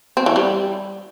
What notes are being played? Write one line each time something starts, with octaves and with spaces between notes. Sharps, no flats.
C4
E3
G3